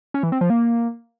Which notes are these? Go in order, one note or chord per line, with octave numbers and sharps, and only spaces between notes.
C#4
E3
C4
F3
A#3